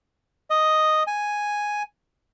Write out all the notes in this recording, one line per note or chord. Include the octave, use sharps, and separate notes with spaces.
D#5
G#5